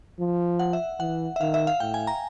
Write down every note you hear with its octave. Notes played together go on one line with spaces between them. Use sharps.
F3
F#5
E5
E3 F#5
E5
D#3 F5
E5
F5
A2 G5
G#5
A#5